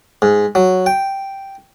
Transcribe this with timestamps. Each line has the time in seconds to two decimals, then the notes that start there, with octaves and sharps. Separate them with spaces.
0.22 G#2
0.55 F#3
0.86 G5